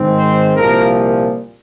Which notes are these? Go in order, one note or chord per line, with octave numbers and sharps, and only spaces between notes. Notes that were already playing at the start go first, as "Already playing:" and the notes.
Already playing: G#2 D#3 G#3 C4
C5
C2 A#2 F3 A#3 A#4